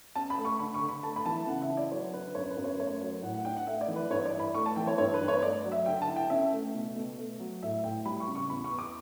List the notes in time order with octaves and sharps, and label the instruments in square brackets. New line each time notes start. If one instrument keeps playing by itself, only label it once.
[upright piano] C#4 A5
B5
A3
C#6
D3 B5
C#6
D3
B5
A3 A5
B5
E3 A5
C#3 F#5
E5
E4
D5
F#3 C#5
D3 B4
F#2 C#5
B4
F#2
C#5
A3 C#5
F#3 C#5
A2 F#5
F#5
D4 G5
F#5
A3 E5
D5
E3
B4
G2 C#5
D5
E4
B5
A3 C#6
A5
E3 G5
C#5
G2 C#5
B4
G2
C#5
A3 D5
F#3
E5
D3 G5
A5
E4
G5
C#4 E5
A3
B2
B2
A3
F#3
A2 E5
A2 G5
G3 B5
C#6
C#3
C#6
E2 B5
C#6
E2
D6